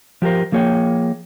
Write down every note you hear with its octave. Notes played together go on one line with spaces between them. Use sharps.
F3 G4 A4 A#4 C5
F3 A#3 G#4 C#5 F5 G5